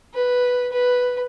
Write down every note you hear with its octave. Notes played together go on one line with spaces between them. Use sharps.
B4
B4